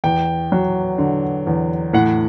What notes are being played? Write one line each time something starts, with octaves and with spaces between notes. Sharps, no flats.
E2 G5
F#3
D3
E2
A2 F#5